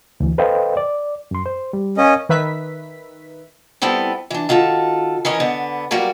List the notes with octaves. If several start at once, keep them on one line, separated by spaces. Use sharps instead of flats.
D2 E3
A4 B4 C5 D#5 F5 G5
D5
F#2 C6
C5
G3
C#4 A#4 D#5 F5 G#5
D#3 B4 E5 B6
G3 B3 C4 E4 A4
E3 D4
D#3 F4 F#4 A4
E3 C#4 A#4 D#5
D3 B3
F#3 G3 A#3 F#4